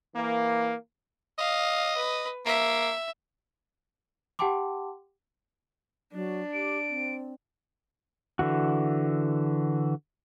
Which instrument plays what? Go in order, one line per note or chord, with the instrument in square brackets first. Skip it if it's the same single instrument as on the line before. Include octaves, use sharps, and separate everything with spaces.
[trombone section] E3 A#3
[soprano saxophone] D#5 [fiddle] F5
[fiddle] B4
[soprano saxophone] A#3 [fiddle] E5
[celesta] G4 F#5 G5 A5 C6 D6
[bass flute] F#3 [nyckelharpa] D4
[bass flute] G4 [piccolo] D7
[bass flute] C4
[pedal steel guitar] D3 E3 F#4